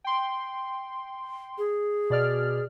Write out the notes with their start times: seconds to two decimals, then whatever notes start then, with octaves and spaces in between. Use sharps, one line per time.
0.04 G5 C6
1.58 G#4
2.10 B2 D5 F6